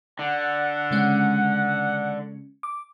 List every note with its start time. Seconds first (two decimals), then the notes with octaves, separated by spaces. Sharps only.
0.19 D3 F#5
0.91 C#3 G#3 C#4
2.63 D6